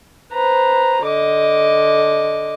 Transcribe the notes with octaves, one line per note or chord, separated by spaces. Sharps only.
B4 C5 A#5
D3 D#5 D6